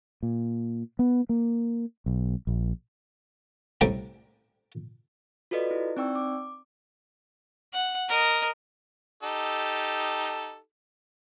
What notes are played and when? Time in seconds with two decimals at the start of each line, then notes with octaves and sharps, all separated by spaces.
0.23 A#2
0.99 B3
1.29 A#3
2.06 B1
2.47 A#1
3.81 A2 C3 G3 G5 A#5
5.51 F4 F#4 A4 B4 D5 D#5
5.71 E4
5.97 C4 D#4 D5 G5 C#6 E6
6.15 D6
7.73 F#5
8.08 A#4 D#5
9.23 D#4 G4 A4